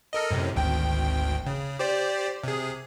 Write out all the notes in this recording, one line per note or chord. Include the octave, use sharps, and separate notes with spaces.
A4 A#4 D#5
F#2 A2 C3
G#1 D2 G5
C#3
G4 C5 D5
C3 G#4